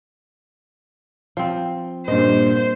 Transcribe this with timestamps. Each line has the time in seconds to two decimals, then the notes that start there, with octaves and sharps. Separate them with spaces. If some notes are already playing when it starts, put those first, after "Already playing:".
1.37 F3 C4
2.08 G2 A#2 C5 D#5